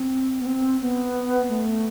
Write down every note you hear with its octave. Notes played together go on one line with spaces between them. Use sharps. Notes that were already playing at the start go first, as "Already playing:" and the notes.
Already playing: C4
B3
C4
B3
A3